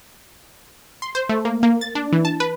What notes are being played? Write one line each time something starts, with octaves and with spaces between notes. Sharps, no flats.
C6
C5
A3
A#3
A#3
A6
D4
E3
A5
B4